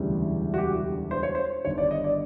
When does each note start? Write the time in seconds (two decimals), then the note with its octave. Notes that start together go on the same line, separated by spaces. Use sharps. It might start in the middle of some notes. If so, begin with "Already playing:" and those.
Already playing: E1 D2 C#3 E3 G3
0.54 F#4
0.58 G4
1.11 C5
1.23 C#5
1.35 C5
1.65 G1 G2 D#3 G3 C#5
1.78 D5
1.91 D#5
2.04 D5